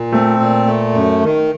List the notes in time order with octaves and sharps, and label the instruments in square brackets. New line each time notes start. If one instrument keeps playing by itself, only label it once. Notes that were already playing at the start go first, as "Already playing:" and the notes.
Already playing: [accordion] A#2
[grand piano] A3 [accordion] C4
[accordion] A#2
A3
F#2
D#3